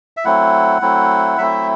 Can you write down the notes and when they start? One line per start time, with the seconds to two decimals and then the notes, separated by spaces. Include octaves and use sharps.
0.17 E5
0.25 F#3 A3 C4 E4 F#5
0.82 F#3 A3 C4 E4
1.38 F#3 A3 C4 E4 E5